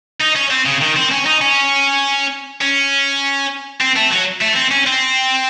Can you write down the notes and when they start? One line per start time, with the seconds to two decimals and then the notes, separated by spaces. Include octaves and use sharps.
0.21 D#4
0.36 C#4
0.51 C4
0.66 C#3
0.81 D#3
0.96 C4
1.11 C#4
1.26 D#4
1.41 C#4
2.62 C#4
3.81 C4
3.96 A3
4.11 F#3
4.41 A3
4.56 C4
4.71 C#4
4.86 C4